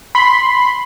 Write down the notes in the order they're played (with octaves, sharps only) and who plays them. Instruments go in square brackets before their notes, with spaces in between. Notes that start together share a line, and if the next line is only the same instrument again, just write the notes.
[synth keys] B5 C6